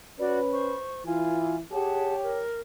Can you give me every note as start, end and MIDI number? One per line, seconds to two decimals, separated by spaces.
0.19 0.75 61
0.19 0.39 66
0.19 0.75 71
0.19 0.39 74
0.51 1.05 72
0.51 1.05 85
1.06 1.60 52
1.06 1.60 64
1.06 1.57 65
1.06 1.57 80
1.72 2.41 67
1.72 2.15 68
1.72 2.41 73
1.72 2.15 78
1.72 2.15 81
2.23 2.60 70